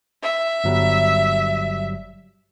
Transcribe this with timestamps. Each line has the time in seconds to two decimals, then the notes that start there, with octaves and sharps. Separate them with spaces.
0.23 E5
0.64 G1 F#3 G3